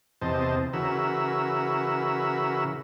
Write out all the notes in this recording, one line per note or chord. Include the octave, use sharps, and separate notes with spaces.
E2 C3 C5 D#5 A5
C#3 E3 F#4 A#4 B5 E6